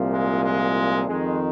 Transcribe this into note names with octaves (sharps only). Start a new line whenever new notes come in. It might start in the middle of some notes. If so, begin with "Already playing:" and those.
Already playing: C2 A#2 F3
G#3
G#3
F2 D#3 G#3